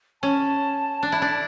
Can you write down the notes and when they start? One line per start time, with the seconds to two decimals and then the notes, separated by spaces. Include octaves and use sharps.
0.22 C#4 A5
1.03 D4
1.12 E4
1.22 D4